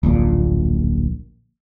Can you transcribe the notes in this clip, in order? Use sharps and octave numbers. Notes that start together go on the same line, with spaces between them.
D1 A#1 A#2